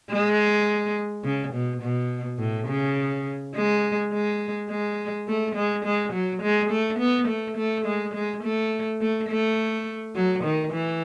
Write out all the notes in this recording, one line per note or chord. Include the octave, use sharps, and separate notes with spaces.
G#3
C#3
B2
B2
A2
C#3
G#3
G#3
G#3
A3
G#3
G#3
F#3
G#3
A3
B3
A3
A3
G#3
G#3
A3
A3
A3
F#3
D#3
E3